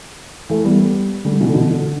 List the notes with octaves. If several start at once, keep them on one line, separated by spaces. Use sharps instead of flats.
E3 A3
G3 B3
D3 G3
B2 E3
D3
B2
D3